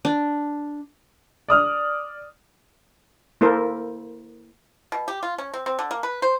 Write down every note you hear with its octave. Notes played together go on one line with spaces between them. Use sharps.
D4
D5 D#6 F6
A#3 E4 A4 A#4 C5
B2
G4
F4
C#4
C4
C4
D3
A#3
B4
C5